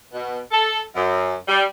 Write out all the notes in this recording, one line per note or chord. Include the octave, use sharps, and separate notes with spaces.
B2
A4
F#2
G3